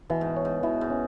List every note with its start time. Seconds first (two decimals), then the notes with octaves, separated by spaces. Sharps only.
0.10 B2 E3
0.21 G#2
0.36 C#5
0.45 G#2
0.63 B2 E4
0.81 G#2
0.90 C#4